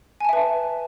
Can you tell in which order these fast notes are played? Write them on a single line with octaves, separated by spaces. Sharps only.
G#5 A5 E5 B4